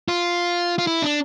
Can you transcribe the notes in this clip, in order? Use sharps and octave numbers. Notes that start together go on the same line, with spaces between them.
F4
F4
E4
D4